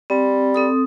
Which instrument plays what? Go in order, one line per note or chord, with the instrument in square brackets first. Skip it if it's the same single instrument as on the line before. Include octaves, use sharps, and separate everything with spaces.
[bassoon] G3 [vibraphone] C4
[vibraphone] C4 A4 D#6